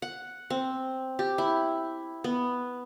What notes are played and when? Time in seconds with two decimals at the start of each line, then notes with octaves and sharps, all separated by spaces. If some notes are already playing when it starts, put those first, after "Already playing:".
0.02 F#5
0.50 C4
1.19 G4
1.38 E4
2.24 B3